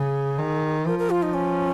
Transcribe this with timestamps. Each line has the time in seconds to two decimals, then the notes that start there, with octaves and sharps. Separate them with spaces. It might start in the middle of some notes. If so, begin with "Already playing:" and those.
Already playing: C#3 G#4
0.38 D#3
0.86 F3 A#4
0.99 A#4
1.10 F4
1.22 D#4
1.34 C#4